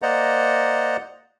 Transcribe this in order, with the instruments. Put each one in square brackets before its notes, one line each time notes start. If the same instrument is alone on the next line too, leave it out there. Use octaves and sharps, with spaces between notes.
[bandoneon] A#3 C5 D5 D#5 F#5 A#5